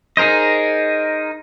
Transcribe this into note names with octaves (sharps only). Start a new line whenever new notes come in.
D#4 G#4 A#4 C5 D#5